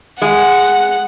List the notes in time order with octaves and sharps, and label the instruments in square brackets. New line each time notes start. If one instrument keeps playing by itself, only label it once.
[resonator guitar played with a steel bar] G#3 [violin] F#5